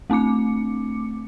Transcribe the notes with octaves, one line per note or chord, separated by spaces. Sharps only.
A3 C4 D4 D6 C#7